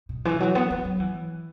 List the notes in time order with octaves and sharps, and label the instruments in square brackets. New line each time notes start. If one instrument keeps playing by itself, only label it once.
[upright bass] B2
E3
F#3
B3
A3
F#3
E3